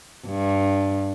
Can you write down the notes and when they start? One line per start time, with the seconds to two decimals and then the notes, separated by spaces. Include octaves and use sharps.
0.27 G2